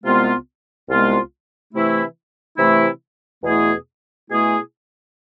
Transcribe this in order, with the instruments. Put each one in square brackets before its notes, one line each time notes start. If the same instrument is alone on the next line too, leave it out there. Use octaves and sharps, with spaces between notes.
[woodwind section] C2 C3 G#3 B3 F4
C2 C3 G#3 B3 F4
C3 E3 A3 E4
C3 E3 A3 E4
E2 B2 A3 E4 G#4
B2 A3 E4 G#4